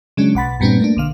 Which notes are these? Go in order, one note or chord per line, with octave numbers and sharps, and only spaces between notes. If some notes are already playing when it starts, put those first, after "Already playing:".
C#3 F#3 G#3 C#4 D4
B1 F#5 B5 A6
G2 A#2 G3 B3 C4 D4
A3 A#3 D4
B1 D3 F5